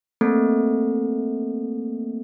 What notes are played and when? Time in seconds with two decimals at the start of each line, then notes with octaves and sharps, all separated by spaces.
0.21 A3 A#3 C4 A4